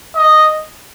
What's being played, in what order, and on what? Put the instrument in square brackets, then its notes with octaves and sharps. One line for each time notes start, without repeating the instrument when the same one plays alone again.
[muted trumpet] D#5